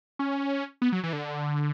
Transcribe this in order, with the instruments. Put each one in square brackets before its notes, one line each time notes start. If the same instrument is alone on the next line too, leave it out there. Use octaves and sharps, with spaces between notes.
[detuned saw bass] C#4
B3
F#3
E3
D3